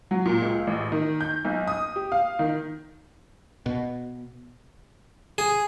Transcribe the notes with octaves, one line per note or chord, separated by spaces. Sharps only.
F#3
A#2
C#2
A1
D#3
G6
B1
D#6
G4
F5
D#3
B2
G#4